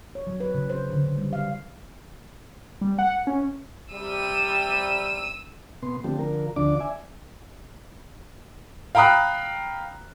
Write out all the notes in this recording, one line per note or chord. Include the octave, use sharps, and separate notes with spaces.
C#5
F#3
B4
C#3
C5
D3
D3
G3
F5
G3
F#5
C#4
C3 G3 E6 D#7
B2 B3 C6
D3 F3 A3 C4 G4
D3 F3 A#4
D2 D3 F3 D4 D5 D6
D5 E5 G#5
F5 G5 A#5 B5 D#6 F#6